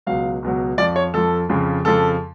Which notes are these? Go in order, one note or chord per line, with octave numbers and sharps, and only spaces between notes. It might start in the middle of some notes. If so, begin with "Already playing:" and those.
C#2 B2 F#3 F5
C#2 B2 F#3
F2 F3 D5
C#5
F2 F3 A4
F2 C#3 F3
F2 C#3 F3 A4